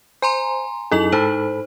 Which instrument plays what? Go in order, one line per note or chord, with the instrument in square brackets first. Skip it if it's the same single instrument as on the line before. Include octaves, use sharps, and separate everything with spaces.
[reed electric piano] C5 [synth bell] G#5 A#5 C6
[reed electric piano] F#2 D#4 G#4 [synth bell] E4 A4 F#7
[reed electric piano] G#2 A4 B5 [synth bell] D#4 C5